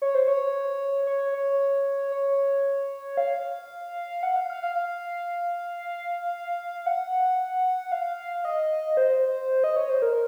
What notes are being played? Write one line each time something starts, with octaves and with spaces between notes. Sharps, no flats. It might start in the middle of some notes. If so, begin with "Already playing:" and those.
C#5
C5
C#5
C#5
C#5
C#5
F5
F#5
F5
F5
F5
F5
F#5
F5
D#5
C5
D#5
C#5
C5
A#4